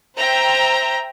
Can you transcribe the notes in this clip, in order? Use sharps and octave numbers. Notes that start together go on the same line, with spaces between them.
C5 E5 G5 A#5